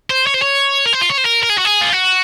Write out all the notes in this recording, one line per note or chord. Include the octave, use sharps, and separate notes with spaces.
C5
C#5
C5
C#5
A#4
C5
F4
C#5
C5
A#4
A#4
G#4
F#4
G#4
F4
F#4